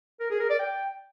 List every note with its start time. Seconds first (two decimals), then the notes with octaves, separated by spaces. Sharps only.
0.20 A#4
0.30 G#4
0.40 A#4
0.50 D5
0.59 G5